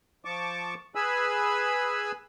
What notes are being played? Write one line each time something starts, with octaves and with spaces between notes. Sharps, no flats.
F3 A5 C#6 D6
G#4 B4 G#5 B5 E6